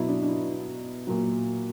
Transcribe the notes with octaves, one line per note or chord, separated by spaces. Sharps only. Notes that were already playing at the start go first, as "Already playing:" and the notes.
Already playing: B2 F#3 E4
D4
D4
E4
A#2 F#3